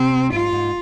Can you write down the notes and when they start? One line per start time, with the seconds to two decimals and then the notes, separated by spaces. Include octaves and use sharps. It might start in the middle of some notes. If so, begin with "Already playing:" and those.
Already playing: C3 C4
0.32 G#2 F4
0.53 G#2